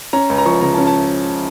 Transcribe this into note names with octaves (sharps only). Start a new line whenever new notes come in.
C#4 A#5
C#2
A#5
F3 C#6
C#3 A#5
A5
C#4
A5